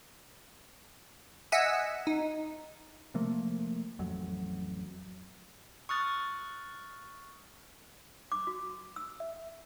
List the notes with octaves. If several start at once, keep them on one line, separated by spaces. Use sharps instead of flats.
D#5 E5 F#5 G#5 E6
D#4
C3 F3 A3 A#3
A1 F2 F#3
C#6 D#6 F6 F#6 A6
D6
F#4
E6
E5